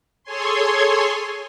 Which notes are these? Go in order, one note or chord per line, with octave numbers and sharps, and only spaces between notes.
G#4 A4 C#5 G#5 C6